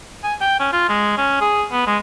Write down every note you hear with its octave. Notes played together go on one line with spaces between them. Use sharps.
G#5
G5
C#4
F4
G#3
C#4
G#4
B3
G#3